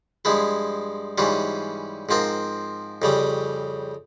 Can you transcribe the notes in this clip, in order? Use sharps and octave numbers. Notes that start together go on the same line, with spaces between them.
G2 F3 G#3 E4
G#2 E3 G3 C#4 F4
G#2 F3 C4 F4 A#4
F2 C#3 G3